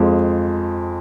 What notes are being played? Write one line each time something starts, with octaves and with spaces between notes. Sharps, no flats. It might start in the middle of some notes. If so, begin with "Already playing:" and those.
Already playing: F2 F3 G#3